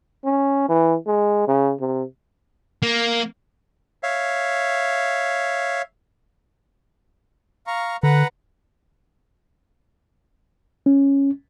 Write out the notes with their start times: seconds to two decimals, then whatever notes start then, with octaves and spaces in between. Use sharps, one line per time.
0.24 C#4
0.69 E3
1.07 G#3
1.48 C#3
1.80 C3
2.83 A#3
4.03 C#5 E5 F5
7.67 F5 A#5 C#6
8.03 D3 B4 F#5 A#5
10.86 C#4